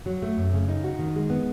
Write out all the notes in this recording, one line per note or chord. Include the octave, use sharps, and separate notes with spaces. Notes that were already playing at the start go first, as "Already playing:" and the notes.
F#3
A3
F#2
C#3
D#4
F#4
D#3
G#3
B3